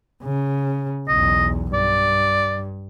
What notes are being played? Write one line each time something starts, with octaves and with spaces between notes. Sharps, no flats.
C#3
B1 E2 D#5
G2 D5